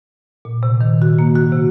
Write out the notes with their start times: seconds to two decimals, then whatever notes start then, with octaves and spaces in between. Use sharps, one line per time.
0.45 A#2
0.63 C3
0.81 D#3
1.02 F#4
1.19 A#3
1.35 F#4
1.52 C3